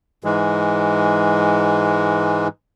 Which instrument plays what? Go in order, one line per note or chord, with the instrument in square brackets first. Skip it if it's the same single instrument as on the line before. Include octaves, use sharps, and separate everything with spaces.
[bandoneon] G#2 E3 G#3